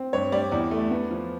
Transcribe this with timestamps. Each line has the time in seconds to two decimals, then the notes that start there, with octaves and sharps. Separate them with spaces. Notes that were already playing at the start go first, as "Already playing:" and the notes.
Already playing: C4
0.13 G2 C#5
0.32 G3 D5
0.51 E2 D5
0.71 A3
0.91 B3
1.11 F3